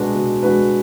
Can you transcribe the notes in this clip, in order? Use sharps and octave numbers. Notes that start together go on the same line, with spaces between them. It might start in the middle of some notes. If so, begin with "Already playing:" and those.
Already playing: B2 G#3 D4 F#4 B4
B2
G#3 D4 F#4 B4